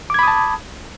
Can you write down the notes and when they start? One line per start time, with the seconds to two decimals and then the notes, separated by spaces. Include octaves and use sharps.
0.10 D6
0.14 G#6
0.19 B5
0.23 D#6
0.28 A5